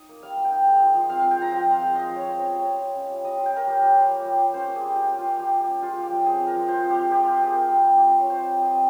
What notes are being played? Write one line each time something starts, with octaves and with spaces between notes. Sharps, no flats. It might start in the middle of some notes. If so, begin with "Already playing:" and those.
Already playing: D#4 D#5
A#3
G3 F5
G3
G5
D#4
G#3
F4
F3
C4 F5
G#3 F5
G5
F4 A#5
F3 G5
C4
F5
G#3
F4 D#5
F3
C#5
C4
C#4 C5
G3
C#5
G3
F4
C#4
G3
G3 D#5
F4
G5
C#4 A#4
G3
G3
F4
A#3
G3
G3
C#4 C5
A#3
G#4
G3
G3 G4
C#4
F4
A#3
G3 G4
G3
G4
C#4
G#3 F4
F3
G4
F3
C4 G#4
G#3
A#4
F3
F3 C5
C4
G4
G#3
F3 G4
F3 F4
C4 G#4
C4 A#4
G3
G3
F4 G4
C4 D#5
C#5
G3 C5
G3
F4
D#5
C4